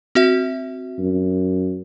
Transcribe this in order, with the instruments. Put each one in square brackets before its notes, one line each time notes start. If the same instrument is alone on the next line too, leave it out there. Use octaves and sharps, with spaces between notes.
[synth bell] C4 F#4 E5
[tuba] F#2